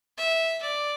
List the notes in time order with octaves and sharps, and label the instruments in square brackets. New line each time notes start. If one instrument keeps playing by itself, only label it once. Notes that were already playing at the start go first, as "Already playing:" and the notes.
[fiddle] E5
D5